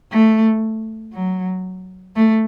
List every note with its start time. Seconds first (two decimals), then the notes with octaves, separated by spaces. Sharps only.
0.11 A3
1.13 F#3
2.16 A3